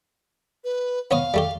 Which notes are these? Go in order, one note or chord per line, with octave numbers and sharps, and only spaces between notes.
B4
B3 C#5 F5 D#6
G3 A3 G4